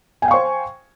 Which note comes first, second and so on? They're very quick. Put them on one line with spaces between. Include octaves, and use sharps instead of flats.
G#5 G5 F5 C#6 C5